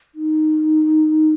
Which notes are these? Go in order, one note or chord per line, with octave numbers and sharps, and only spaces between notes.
D#4